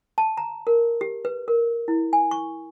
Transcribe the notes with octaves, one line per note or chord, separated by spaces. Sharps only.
A5
A#5
A#4
G4
B4
A#4
E4
G#5
C#6